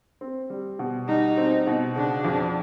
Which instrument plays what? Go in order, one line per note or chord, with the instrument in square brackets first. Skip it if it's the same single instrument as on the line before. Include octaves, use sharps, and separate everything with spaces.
[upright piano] C4
G3
B2
[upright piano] G3 [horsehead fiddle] D#4
[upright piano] C4
B2
[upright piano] C#3 [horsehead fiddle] D4
[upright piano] F2